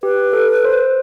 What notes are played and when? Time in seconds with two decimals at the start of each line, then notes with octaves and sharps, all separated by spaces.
0.03 G4 B4
0.33 A4
0.64 C5